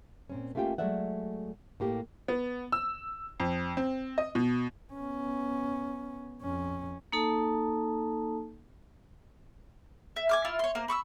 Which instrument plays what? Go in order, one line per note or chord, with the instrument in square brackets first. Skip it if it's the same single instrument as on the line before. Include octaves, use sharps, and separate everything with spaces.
[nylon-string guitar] A#2 C4 C#4
A3 A#3 C#4 F4 G4 G5
F#3 G#3 A3 D5 E5 F#5
A2 A#3 G4
[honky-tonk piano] B3
E6
F2
C4
D#5
B2
[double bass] B3 C#4
F2 C#4
[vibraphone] A#3 D#4 A4 A5
[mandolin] E5
G#5 D6 F6
E4 F4
C#5 C6
A#3 C5
B5 C#6 D6 E6